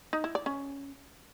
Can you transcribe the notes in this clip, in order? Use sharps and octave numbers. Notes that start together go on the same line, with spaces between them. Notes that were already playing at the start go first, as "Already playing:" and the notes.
D#4
E4
D5
C#4